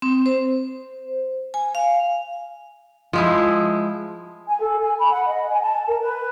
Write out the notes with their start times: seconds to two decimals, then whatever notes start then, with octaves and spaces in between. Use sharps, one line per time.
0.02 C4
0.26 C5
1.54 G#5
1.75 F5
3.13 F3 G#3 E4
4.47 G#5
4.59 A4
4.78 G#5
4.98 B5
5.11 F#5
5.25 D#5
5.48 G#5
5.61 A5
5.87 A#4
6.01 B4